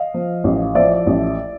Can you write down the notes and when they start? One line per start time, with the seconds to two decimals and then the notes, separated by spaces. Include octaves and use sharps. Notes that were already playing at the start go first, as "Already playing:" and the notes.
Already playing: D#5 F5
0.14 F3
0.44 A1
0.75 F3 D5 E5
1.07 A1